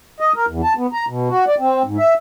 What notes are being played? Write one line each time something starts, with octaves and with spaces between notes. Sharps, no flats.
D#5
A#4
E2
A5
B3
A#5
B2
F#4
D5
C4
G#2
E5